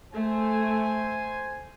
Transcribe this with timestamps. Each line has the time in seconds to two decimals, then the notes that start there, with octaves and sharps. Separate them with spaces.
0.12 A3 C5 G#5